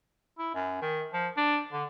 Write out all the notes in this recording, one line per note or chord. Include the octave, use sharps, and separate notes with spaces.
E4
F#2
D#3
F3
D4
D3